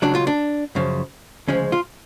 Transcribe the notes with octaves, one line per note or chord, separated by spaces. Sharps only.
C#2 C#3 F#3 D4
F4
D4
F#2 C#3 F3
D2 C#3 F3 G#3 C#4
F4